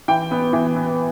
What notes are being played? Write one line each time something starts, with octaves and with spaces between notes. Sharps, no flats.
E3 G5
B3
E3
B3